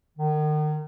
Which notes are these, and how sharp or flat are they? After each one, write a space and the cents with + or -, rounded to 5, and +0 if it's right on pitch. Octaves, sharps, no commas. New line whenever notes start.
D#3 -35